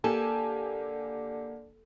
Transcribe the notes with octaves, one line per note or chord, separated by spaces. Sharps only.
D3 A#3 G4 A4 G#5